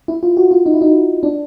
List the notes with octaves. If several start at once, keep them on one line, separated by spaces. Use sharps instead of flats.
E4
F4
F#4
F4
D#4
E4
D#4
D4